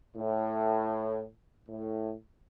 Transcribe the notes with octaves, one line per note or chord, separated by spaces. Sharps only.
A2
A2